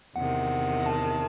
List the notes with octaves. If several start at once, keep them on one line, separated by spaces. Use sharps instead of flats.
E2 C3 D#3 F#5
A5